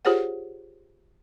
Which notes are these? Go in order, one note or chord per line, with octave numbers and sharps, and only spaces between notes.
F4 G4 G#4 C5 C#5 F#5